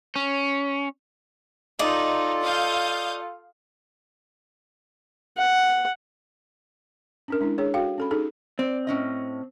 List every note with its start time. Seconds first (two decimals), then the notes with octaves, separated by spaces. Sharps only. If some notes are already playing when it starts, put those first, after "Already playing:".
0.16 C#4
1.79 D#4 F4 A4 D5 D#5
2.42 F5 D#6 G6
5.38 F#5
7.28 C#4 D4 A#4
7.41 G#3 D4 E4
7.58 D4 G#4 C#5
7.74 F#4 A4 F5 G5
7.98 C#4 A4 B5
8.11 D#4 G#4 A4
8.59 C4 D5
8.87 A2 C#4 D#5